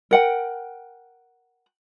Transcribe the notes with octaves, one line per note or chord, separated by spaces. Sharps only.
A#4 F#5 G5